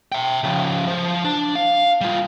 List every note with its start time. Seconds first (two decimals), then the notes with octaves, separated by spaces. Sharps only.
0.12 E5 G5
0.43 C#3 F3
0.87 F3 C5
1.24 D4
1.55 F5
2.01 G3 F4